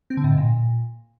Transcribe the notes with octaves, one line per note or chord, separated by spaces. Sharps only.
C4
D3
A2
G#2
A#2